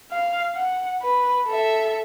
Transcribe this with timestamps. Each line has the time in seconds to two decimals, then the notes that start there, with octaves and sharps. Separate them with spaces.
0.12 F5
0.55 F#5
1.02 B4
1.48 A4 E5